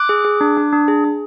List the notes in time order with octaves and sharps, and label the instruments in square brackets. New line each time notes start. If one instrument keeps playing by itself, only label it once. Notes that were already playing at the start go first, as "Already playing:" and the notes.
Already playing: [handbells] D6 F#6
G#4
G#4
D4
D4
D4
G#4
G#4